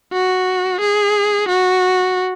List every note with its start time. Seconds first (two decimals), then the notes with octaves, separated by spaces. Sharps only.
0.13 F#4
0.81 G#4
1.49 F#4